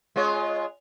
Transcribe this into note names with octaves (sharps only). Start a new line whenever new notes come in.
G#3 F4 C#5